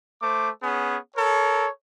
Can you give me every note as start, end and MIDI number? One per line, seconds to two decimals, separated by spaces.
0.21 0.49 57
0.21 0.49 72
0.21 0.49 86
0.62 0.97 59
0.62 0.97 61
0.62 0.97 68
1.16 1.68 69
1.16 1.68 70
1.16 1.68 73